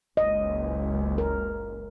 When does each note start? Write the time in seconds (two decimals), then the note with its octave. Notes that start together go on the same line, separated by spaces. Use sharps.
0.17 F#1 C#2 D#5
1.18 A#4